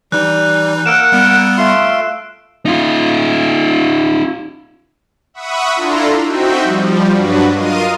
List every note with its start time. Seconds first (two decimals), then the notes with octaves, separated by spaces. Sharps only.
0.12 E3 G3 D#4 F#6
0.86 A#3 A#4 F#5 E6 D7 E7
1.12 G3 B3
1.58 A3 F4 C6
2.65 D#4 F4
5.34 E5 F#5 B5 C#6 D#6
5.76 D4 E4 F4 A4 A#5 C6
6.24 C4 D#4 F#4 E5 G5
6.63 F3 G3
7.12 G2 F#3 D4 F#4 B4
7.52 F4 A#4 D#5 F5 D#6 D#7